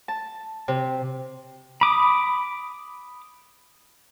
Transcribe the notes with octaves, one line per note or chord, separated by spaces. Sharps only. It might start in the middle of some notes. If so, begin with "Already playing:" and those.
A5
C3
B5 D6 D#6